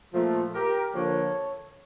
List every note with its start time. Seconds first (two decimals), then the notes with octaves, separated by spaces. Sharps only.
0.14 A#2 F3 A3 F4 A4
0.54 G4 A#4
0.94 D3 F3 A#3 A4 C#5